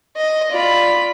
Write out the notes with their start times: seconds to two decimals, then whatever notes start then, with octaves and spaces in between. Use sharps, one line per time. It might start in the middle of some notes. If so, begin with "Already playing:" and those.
0.17 D#5
0.51 F4 D5 B5